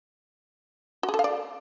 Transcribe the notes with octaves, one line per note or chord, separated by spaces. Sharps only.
F#4
G#4
A4
F5
D5